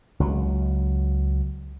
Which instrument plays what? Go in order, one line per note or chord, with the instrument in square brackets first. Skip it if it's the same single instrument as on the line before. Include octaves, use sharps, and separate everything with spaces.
[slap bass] C#2 F#3